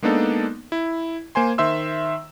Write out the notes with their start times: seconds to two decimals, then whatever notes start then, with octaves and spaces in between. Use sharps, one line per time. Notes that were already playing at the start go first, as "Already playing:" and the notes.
0.02 G#3 A#3 B3 D4 D#4 A4
0.72 E4
1.35 A#3 C5 G#5 C6
1.58 D#3 C5 E5 C6 E6